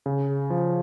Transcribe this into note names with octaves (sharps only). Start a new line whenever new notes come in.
C#3
F3